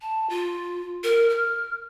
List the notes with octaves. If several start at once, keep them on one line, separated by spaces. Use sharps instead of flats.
A5
F4
A#4
F6